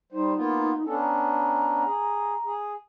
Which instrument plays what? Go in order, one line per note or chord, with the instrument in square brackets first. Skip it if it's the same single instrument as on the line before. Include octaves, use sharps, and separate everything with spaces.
[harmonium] G3 C5 [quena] D#4
[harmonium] A#3 B3 F4
[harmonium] B3 C#4 D4 [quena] A4
[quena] A#5
[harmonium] G#4
G#4